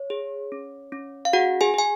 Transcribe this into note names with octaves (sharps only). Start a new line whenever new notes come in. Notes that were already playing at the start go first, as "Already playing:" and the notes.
Already playing: C#5
G#4
C#4
C#4
F5
F#4 G#4 F#5
G#4 G#5
G#4 G#5